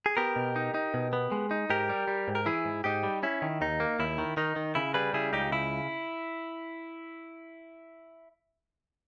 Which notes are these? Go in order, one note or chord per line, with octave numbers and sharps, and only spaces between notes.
G#4
B3 G4 A#4
B2
D#4
D#4
B2
B3
G#3
D#4
G#2 G4 A#4
G3
G3
G#2
A#4
E3 E4 G#4
G#2
G#2 D#4 G4
G3
C#4 E4
D#3
D#2 D#4
A#3
D#2 E4
D#3
D#3 D#4
D#3
C#3 E4
G3 G#4 B4
C#3 E4 G#4
C#2 D#4 G4
C#3 E4